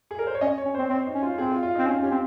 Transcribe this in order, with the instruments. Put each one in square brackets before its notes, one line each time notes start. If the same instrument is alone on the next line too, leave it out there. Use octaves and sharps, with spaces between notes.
[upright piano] G#4
A#4
C5
C#5
[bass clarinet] C#4 [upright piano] D#5
[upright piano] C#5
[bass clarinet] C#4
[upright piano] C5
[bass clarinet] C4
[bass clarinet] C4 [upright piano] C5
[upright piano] D#4
[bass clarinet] C#4
[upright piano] F4
[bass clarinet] C4 [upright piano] G#4
[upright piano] F4
F4
D#4
[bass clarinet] C4
[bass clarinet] C#4 [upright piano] F4
[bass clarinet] C#4 [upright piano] G4
[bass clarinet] C4